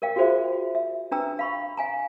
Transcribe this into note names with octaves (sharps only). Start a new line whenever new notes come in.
A#4 D5 F5 G5
F4 F#4 G#4 C5 D5 E5
E5
D4 B4 G5 A#5 E6
F5 B5 C#6
F5 G#5 A#5